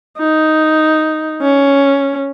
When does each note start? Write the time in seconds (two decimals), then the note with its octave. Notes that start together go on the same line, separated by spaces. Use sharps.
0.19 D#4
1.42 C#4